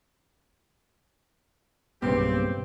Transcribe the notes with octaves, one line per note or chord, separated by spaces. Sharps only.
B1 G2 A#2 C#3 B3 C4 G4 G5